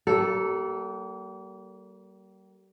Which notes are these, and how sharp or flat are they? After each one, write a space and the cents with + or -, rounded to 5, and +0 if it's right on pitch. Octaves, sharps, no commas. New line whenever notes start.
G3 -40 A#3 +0 A4 +0